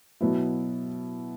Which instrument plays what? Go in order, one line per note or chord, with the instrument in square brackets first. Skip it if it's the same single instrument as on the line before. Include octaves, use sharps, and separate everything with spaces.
[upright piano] B2 F#3 B3 E4